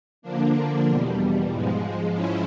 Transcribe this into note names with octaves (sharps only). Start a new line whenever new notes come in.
D3 F3 A#3 D4
E2 B2 G3
G#2 F3 G#3
G#2 F3 G#3 C#4 E4